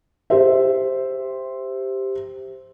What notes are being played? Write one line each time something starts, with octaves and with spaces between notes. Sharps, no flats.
G4 C5 E5